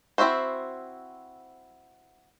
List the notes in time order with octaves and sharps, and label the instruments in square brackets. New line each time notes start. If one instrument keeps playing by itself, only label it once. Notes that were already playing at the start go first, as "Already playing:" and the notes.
[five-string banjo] C4 E4 F#4 C5